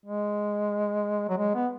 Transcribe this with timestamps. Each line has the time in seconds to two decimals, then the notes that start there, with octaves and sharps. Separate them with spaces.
0.06 G#3
1.29 F#3
1.38 G#3
1.55 B3